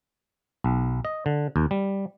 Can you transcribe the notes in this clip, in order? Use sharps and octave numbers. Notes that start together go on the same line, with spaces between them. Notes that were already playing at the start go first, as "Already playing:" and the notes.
B1
D#5
D3
D#2
G3